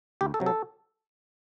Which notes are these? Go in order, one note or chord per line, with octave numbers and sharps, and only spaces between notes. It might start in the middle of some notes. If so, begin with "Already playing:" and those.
D2 G4
A4
C3 F#3
A4